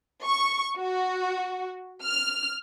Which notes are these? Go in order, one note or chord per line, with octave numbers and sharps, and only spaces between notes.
C#6
F#4
F6